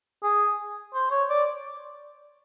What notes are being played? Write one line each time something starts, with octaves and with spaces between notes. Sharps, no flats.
G#4
C5
C#5
D5